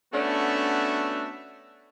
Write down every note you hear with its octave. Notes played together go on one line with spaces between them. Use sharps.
A3 B3 C#4 D4 F#4 E5